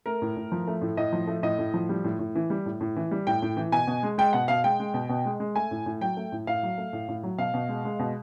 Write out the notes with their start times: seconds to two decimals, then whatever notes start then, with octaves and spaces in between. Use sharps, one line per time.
0.06 A3 A#4
0.22 A2
0.37 A2
0.52 F3
0.67 A3
0.82 A2
0.97 A2 D#5
1.13 F3
1.27 A3
1.43 A2 D#5
1.59 A2
1.74 F3
1.89 G3
2.04 A2
2.19 A2
2.35 E3
2.50 G3
2.66 A2
2.81 A2
2.96 E3
3.11 G3
3.27 A2 G5
3.42 A2
3.57 E3
3.72 B2 G#5
3.87 B2
4.03 G#3
4.18 G#3 G5
4.33 B2 F#5
4.48 B2 F5
4.64 G#3 G5
4.80 G#3
4.94 B2
5.09 B2
5.25 G#3
5.40 G#3
5.55 A3 G#5
5.71 A2
5.86 A2
6.01 F#3 G5
6.17 A3
6.32 A2
6.47 A2 F5
6.63 F#3
6.78 A3
6.93 A2
7.08 A2
7.23 F#3
7.38 B2 F5
7.54 B2
7.69 G#3
7.85 G#3
7.99 B2